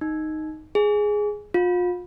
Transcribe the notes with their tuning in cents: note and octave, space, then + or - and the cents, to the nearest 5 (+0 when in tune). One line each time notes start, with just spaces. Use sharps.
D#4 +0
G#4 +0
F4 +35